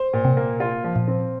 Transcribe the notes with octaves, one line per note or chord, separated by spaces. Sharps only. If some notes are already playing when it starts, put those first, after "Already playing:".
Already playing: C5
A#2
C3
A#3
F4
F3
A#2
C4